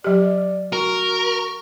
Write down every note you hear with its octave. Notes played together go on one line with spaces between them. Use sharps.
F#3 G4 D5
F#4 A#4